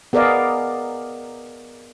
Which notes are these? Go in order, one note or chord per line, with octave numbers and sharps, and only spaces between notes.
B3 G#4 A#4 D5 D#5 F5